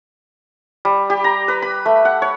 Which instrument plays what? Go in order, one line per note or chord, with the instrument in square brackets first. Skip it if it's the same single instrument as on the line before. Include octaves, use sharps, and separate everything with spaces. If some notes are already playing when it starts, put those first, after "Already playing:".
[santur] G3
G4
A#5
B4
B5
A3
F#5
C#5